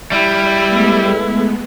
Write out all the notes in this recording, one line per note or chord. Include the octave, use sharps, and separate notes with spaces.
G3 E4
G#3 A3 B3